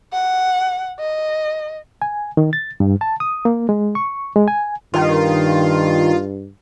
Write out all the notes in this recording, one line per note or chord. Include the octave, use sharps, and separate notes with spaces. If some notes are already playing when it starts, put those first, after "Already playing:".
F#5
D#5
G#5
D#3
A6
G2
A5
D#6
A#3
G#3
C#6
G#3
G#5
G2 D#3 F4